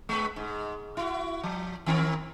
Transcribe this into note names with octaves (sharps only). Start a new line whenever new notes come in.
G#3 B4
G#2
E4 F#4
F3
D#3 C4 A#4